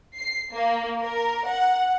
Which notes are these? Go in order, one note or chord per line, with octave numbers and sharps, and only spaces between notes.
C7
A#3
A#4
F#5